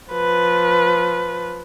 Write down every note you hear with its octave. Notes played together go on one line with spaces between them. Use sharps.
F3 B4